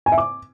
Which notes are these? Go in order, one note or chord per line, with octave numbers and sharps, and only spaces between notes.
G#5
E5
D6